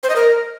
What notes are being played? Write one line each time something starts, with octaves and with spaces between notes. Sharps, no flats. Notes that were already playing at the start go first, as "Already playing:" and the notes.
C5
D#5
A#4